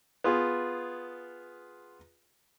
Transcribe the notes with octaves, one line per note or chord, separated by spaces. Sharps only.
B3 F4 G#4